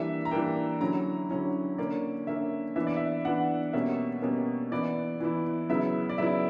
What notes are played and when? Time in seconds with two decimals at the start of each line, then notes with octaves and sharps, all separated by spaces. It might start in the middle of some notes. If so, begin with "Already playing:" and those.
Already playing: E3 G3 A#3 D4 E5
0.25 A#5
0.31 E3 G3 A#3 D4 G5
0.80 D3 F#3 C#4 E4 A#5
1.30 D3 F#3 C#4 E4
1.78 D3 A#3 C#4 D5
2.27 D3 A#3 C#4 E5
2.76 E3 B3 D4 E5
2.87 D5
2.97 E5
3.25 E3 B3 D4 F#5
3.73 B2 G3 A#3 C#4 E5
4.22 B2 G3 A#3 C#4
4.72 E3 B3 E4 D5
5.20 E3 B3 E4
5.70 C#3 F#3 B3 E4 E5
6.09 D5
6.18 C#3 F#3 B3 E4 E5